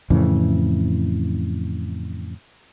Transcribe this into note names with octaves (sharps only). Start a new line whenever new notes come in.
F2 A2 C#3 E3